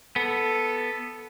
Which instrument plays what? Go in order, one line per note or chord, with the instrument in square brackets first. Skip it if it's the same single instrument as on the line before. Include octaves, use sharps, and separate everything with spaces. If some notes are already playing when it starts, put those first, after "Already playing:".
[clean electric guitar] B3 [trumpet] A4